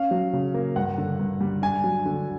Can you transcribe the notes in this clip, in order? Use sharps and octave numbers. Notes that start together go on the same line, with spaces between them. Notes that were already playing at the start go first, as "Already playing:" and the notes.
Already playing: C#4 F5
F#3
C#3
A#3
G2 F#5
D3
G2
G3
D4 G#5
F#3
D3